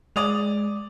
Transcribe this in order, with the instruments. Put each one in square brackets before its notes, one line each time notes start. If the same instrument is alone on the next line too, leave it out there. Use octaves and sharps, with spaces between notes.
[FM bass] G#3 [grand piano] D5 D#6 F7